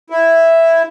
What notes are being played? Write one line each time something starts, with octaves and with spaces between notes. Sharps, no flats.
E4